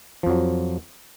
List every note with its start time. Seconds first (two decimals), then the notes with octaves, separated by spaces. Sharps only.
0.23 F3
0.26 F2
0.30 F#3